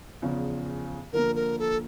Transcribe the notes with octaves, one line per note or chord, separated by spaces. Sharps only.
E2 C#3 F3
D3 F3 A#3 A#4
A#4
A4